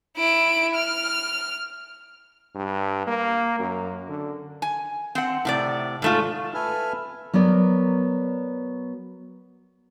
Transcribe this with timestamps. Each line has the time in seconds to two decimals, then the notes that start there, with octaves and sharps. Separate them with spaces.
0.17 E4 D7
0.76 F6
2.55 G2
3.07 A#3
3.59 F#2
4.08 D3
4.62 G#5
5.15 C4 F#5
5.45 A2 C3 D5
6.02 G#2 A3 F4
6.54 A4 B4 E5 G#5 F6
7.33 F#3 B3 A#4 D5